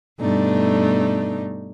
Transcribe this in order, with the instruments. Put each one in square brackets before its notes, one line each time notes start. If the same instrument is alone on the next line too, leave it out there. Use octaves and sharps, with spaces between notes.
[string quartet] G2 B2 A3 D4 D#4